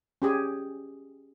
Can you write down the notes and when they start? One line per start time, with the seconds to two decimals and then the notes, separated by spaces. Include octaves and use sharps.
0.22 C#4 G4 G#4